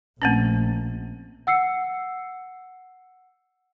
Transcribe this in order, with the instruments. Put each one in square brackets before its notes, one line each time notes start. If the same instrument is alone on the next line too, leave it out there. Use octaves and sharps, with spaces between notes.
[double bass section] A#1 [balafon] A3 C4 C#4
[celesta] F#5 E6 C7 C#7